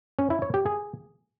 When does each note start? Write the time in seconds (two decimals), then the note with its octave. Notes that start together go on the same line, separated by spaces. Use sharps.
0.19 C#4
0.30 E4
0.42 C#5
0.54 G4
0.66 G#4